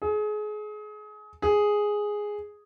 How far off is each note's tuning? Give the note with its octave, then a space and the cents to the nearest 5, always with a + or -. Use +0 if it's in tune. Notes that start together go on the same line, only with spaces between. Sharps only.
G#4 +30
G#4 +0